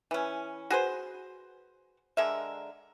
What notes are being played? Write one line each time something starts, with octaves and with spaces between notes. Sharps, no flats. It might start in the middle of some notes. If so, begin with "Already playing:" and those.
E3 C#4
F#4 G#4 B4 C5
D3 G#3 A#4 E5